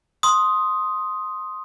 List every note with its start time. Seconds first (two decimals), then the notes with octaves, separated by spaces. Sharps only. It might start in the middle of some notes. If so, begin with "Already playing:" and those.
0.23 C6 D#6